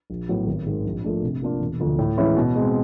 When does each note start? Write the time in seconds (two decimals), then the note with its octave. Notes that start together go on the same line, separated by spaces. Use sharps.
0.10 A#1
0.29 A2 F#3 B3
0.47 G#1
0.66 G#2 D#3
0.85 A#1
1.04 A#2 F3 A3 D4
1.23 C3
1.42 F3 A#3 D4 F4
1.61 E1
1.80 D2 D3 F3
1.99 A2
2.18 E3 G#3 C#4 E4
2.36 B2
2.56 G#3 C4